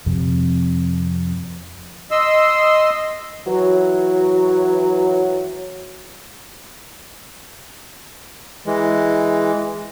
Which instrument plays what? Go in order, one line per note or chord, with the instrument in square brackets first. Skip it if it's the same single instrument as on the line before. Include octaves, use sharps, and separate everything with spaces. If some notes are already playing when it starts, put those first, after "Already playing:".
[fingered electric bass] F2 C3
[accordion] D#5 C6 E6
[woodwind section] E3 F#3
[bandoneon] E3 G#3